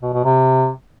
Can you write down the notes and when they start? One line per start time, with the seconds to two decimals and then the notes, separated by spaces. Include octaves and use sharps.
0.02 B2
0.14 B2
0.25 C3